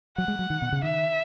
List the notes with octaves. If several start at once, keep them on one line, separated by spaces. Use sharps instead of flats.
F#3 F#5
G#3
F#3
D#3
B2
C#3
D#3 E5